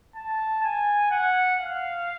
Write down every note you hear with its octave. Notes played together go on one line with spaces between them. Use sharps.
A5
G#5
F#5
F5